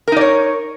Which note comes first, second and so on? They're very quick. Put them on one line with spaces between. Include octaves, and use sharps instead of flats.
A#4 D#4 D5 C#5